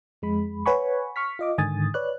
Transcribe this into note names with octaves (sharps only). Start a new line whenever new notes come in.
F2 G#3 B5
B4 C#5 F#5 G#5 B5 C#6
C#6 F6 B6
F4 D#5 D6
G#2 D3 D#3 G#5 D#6 A6
B4 C#5 D5 F#6